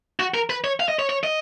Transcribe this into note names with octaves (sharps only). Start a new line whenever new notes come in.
F#4
A#4
B4
C#5
F5
D#5
C#5
C#5
D#5